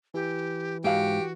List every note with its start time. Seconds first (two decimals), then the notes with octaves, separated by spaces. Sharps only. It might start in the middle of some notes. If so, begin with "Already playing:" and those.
0.14 E3 G4
0.84 G#2 F#4 G4 F5